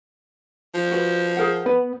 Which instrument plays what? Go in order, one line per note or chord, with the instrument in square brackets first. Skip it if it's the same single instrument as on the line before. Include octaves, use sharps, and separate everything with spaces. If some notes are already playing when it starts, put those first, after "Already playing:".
[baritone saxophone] F3
[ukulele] F#4 B4
G#4 A#4 F#5
[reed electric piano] B3 [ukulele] B4